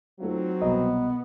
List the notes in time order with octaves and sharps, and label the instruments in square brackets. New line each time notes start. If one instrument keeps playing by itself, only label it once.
[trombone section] F#3 C4 [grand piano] A3 D#4 F4
[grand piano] C2 B2 A#5 [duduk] B3 [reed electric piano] D#5